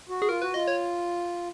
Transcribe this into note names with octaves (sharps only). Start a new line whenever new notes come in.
F#4
G#4
F4 A#4
F#4 B4
F4 D#5
C#5